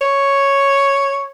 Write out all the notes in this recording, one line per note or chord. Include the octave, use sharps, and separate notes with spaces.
C#5